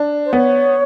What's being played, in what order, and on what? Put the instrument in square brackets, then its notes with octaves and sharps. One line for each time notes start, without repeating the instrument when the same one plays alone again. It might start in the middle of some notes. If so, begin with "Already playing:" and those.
Already playing: [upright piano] D4
[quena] C5
[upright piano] B3 [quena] C#5